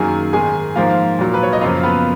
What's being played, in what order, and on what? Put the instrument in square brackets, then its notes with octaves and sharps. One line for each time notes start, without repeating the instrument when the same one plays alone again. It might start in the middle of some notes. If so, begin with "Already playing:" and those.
Already playing: [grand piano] F#2 D#3 F#3 A#3 G#4 G#5
G#2 D#3 G#3 G#4 G#5
G#2 F3 A#3 F4 F5
A#2 F#3 A#3
B4
C#5
D#5
F#2 C#3 F3 A#3 F4 F5
B3 B4